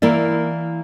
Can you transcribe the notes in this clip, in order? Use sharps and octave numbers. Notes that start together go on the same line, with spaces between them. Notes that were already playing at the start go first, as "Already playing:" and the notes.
E3 A#3 E4 A#4 D5